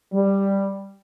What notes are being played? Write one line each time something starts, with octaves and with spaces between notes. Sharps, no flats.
G3